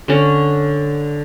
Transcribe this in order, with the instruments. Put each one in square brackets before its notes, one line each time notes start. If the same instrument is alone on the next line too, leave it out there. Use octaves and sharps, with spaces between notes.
[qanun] D3 C#4